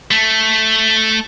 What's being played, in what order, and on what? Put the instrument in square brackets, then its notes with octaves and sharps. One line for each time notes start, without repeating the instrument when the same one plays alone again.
[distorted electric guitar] A3